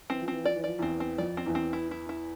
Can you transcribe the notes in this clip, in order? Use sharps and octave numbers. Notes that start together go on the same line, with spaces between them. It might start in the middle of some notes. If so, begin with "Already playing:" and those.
E3 C4
F3
E3 C4
F3 D5
E3
F3 D5
E2 E3 C4
C4
F2 F3 D5
C4
E2 E3
C4
E4
E4
E4